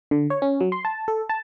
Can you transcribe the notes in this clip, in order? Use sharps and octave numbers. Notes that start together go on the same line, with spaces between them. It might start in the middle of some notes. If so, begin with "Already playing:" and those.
D3
C#5
C#4
F#3
C6
A5
A4
A5